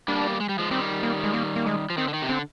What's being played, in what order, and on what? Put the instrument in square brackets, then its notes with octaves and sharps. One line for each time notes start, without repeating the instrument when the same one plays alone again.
[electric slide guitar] G3 A#3 [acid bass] D4
[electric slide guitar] G#3
G3
F3 G#3
[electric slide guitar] D#3 G3 [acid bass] C4
[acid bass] A#3
G#3
A#3
A#3
G#3
[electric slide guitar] F3
[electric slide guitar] D#3 [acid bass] C4
[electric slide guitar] D3
D#3
C3
[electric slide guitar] D3 [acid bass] C4